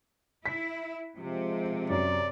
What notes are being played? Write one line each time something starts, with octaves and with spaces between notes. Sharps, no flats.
E4 B6
C3 F3 G#3
F#2 D5